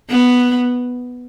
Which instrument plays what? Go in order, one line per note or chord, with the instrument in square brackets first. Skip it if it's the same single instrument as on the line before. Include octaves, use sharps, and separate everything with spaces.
[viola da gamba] B3